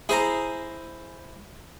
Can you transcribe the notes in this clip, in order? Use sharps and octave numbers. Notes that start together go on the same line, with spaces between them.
E4 G#4 C5 A#5